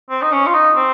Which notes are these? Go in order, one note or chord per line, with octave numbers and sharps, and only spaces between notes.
C4
D#4
C#4
F4
D#4
C4